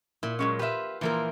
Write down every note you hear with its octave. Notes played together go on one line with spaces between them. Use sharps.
A#2 E4
F#3 G#3 C#4
F4 G4 B4 E5
A#2 E3 F3 A#3 E4 A#4